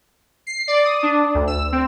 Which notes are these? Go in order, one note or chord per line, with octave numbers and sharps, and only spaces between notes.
C7
D5
D#6
D4
D2
E6
C4